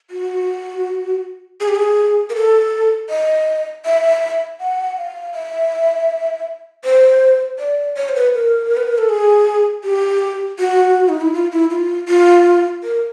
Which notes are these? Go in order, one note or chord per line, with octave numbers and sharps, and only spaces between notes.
F#4
G#4
G4
G#4
A#4
A4
D#5
E5
F#5
F5
E5
C5
D5
C#5
C5
B4
A#4
B4
A#4
A4
G#4
G4
F#4
D#4
E4
F4
E4
F4
F4
A#4